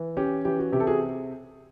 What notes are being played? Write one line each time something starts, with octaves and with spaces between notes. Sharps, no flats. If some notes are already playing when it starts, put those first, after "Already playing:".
Already playing: E3
C#4 G4
E3 G4
F#4
C3 G4
A4
F#4 G#4